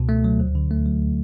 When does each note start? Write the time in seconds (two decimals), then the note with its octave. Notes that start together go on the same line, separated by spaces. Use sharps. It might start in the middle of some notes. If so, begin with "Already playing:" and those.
Already playing: C#2 B2
0.09 A3
0.24 F#3
0.40 D2
0.55 D3
0.71 A3
0.86 F#3